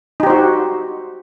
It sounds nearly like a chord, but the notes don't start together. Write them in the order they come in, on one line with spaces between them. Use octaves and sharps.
D#4 G4 C5 F#4